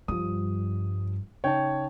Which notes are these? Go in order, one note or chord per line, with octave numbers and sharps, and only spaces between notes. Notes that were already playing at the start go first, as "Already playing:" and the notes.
G2 F3 G3 D#6
C#3 D#4 C#5 G5 A5